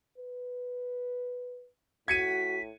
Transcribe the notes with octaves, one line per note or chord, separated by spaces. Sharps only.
B4
A2 F#4 G#6 B6 C#7 D#7